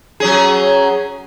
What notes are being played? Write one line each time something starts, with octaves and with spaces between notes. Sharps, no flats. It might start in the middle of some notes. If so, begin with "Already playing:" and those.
F#3 C#4 G#4